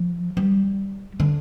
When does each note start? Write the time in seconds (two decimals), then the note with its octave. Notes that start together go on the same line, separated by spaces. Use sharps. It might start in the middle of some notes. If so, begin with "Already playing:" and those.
Already playing: F3
0.37 G3
1.20 D3